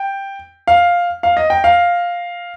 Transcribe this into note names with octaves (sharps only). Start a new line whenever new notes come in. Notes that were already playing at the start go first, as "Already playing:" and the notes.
Already playing: G5
F5
F5
D#5
G5
F5